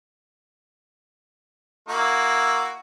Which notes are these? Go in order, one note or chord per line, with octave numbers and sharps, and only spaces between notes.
A#3 E4 F#4